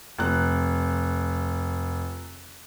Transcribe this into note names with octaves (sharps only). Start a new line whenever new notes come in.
F1 F#6